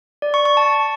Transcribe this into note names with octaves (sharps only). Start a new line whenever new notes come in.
D5
C#6
C#6
A5